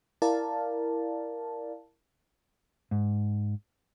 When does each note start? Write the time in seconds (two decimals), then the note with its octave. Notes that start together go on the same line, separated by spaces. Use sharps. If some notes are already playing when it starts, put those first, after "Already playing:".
0.22 E4 A#4 D5 F5 A5
2.91 G#2